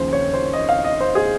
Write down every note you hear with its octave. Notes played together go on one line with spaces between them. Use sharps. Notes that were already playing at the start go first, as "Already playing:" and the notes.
Already playing: D#2 C#3 F3 C5
C#5
C5
D#5
F5
D#5
C5
G#4